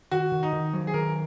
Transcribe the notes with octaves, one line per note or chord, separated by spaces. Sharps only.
D#3 F#4
D#3
D#4
D#3
F#3
G#4
D#3 A#4